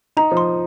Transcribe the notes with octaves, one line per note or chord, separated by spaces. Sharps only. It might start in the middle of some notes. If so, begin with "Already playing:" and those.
D#4 A#5
F3
C6